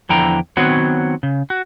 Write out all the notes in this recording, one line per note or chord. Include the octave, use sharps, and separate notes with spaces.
E2 D3 F3 E4 G5 A#5
D#3 F#3 B3 C4 F#4 C#5
C#3
F#4